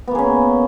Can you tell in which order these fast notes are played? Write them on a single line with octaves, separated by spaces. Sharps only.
B3 A#3 G#4 C#4